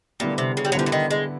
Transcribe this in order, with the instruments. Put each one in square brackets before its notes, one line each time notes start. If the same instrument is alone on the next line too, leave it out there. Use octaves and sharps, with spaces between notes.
[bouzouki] A#2 [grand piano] D3 G3 B3 E4 G4
[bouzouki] C3
C#3
G3
F#3
[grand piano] D3 G3 B3 E4 G4 [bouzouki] F3
[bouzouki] E3
D#3
G#3